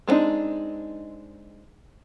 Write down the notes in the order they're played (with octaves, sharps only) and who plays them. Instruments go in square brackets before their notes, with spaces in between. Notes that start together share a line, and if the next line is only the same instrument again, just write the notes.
[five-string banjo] G#3 B3 C4 D4 D#4